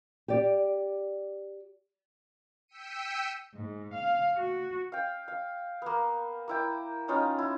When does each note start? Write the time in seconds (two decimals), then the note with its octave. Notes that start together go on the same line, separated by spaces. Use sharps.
0.28 G4 D5
2.68 G5 E6 B6 C#7 D#7
3.54 G#2
3.94 F5
4.37 F#4
4.92 F5 G5
5.28 F5
5.82 A#3 B3
6.48 A#3 E4 G5
7.08 B3 C#4 D#4 F4
7.38 E4